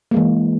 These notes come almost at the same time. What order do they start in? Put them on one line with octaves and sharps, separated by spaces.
A#3 G#3 E3